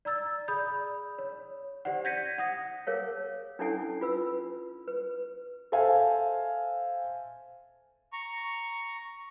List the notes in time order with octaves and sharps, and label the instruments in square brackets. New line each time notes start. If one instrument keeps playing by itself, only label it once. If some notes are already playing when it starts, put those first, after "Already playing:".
[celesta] D5 A#5 E6 A6
G#4 D5 B5 D#6 G6
C#5
G4 C5 D5 F#5
G6 G#6 A#6 B6 C#7 D#7
F#5 D#6 A#6
[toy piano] G#4 A#4 C#5 F5
C#4 D4 E4 A4 F#5 G#5
F4 B4 E6
B4
[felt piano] A4 C5 E5 F5 G#5
[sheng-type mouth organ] A#5 C#6